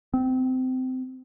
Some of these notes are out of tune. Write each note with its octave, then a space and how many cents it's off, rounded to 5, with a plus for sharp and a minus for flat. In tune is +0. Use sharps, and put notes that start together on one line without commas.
C4 -25